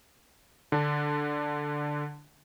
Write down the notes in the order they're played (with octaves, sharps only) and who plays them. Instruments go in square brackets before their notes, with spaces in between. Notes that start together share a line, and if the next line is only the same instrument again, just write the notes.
[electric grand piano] D3 D4